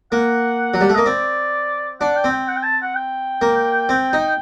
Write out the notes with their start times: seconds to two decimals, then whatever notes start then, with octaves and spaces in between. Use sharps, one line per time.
0.12 A#3 F#5
0.74 F#3
0.81 G3
0.89 A3
0.95 A#3 D#5
1.06 C4 D5
2.01 D4 F#5
2.16 G5
2.24 C4
2.32 G5
2.48 F#5
2.56 G5
2.63 A5
2.83 F#5
2.95 G5
3.42 A#3
3.89 C4
4.13 D#4